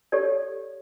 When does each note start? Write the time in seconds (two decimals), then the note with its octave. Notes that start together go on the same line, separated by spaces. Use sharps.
0.12 G4 A4 C#5 D5